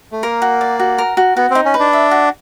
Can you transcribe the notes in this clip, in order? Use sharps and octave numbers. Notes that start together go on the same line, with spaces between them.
A3
A#3 A#4
F#4
D5
F#4
A#4
F#4
B3 F#4
C4 D#4
C#4
B4
D4
E5
F#4